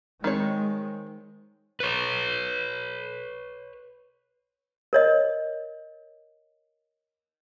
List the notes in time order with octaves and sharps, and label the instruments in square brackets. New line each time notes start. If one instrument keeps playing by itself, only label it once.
[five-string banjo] D#3 C4 C#5 [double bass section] G#3
[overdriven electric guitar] B4 C#5
[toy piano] A#4 C#5 D#5